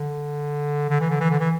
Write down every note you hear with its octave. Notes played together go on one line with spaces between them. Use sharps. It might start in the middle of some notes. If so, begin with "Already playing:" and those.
Already playing: D3
D3
E3
D3
E3
D3
E3